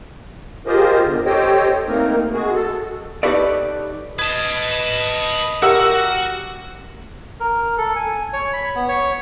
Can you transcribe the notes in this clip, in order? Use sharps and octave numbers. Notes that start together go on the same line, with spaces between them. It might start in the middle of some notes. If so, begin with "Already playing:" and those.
F4 G4 G#4 A#4 C5 D#5
E2 D3
G4 A4 C5 C#5 D#5 G5
A3 A#3 C4 D#4 A#4
G#3 F#4 G#4
A4
D#4 G4 A4 B4 C#5 D5
B4 D#5 A5 G#6
F#4 G4 A#4 F#5 E6
A#4
A4
G#5
C#5
B5
B3
C#5